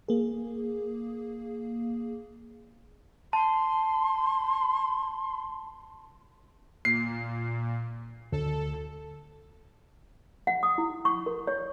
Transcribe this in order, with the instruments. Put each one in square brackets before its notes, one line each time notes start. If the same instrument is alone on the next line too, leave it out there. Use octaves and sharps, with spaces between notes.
[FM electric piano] A#3 G#4
[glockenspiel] A5 [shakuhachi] C6
[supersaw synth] A#2 [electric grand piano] C7
[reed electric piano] D2 [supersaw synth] A4
[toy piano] F#5
D#6
E4
C#6
A#4
C#5